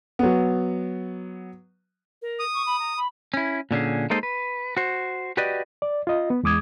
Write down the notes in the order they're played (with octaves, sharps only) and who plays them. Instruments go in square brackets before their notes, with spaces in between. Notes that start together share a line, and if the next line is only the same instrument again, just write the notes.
[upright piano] F#3 B3
[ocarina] A#4
[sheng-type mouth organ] D#6
[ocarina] C#6
B5
A#5
B5
[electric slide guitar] C#4 E4
A#2 D3 C#4 G#4
G#3 A#3 D#4 A4 C5 D#5
B4
F#4 C5
F#4 G4 B4 D5 D#5
[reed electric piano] D5
F4 D#5
B3
E2 G#3 D6 D#6 G#6